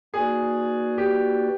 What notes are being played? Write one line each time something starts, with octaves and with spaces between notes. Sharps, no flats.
A#3 D#4 F#4 G#4 B4 D5
G4